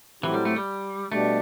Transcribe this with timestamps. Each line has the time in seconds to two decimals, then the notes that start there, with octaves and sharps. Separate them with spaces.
0.23 A2 E3 F#3 C4 E4 G4
0.34 G3
0.45 A3
0.56 G3
1.11 B2 G3 A3 D4 G4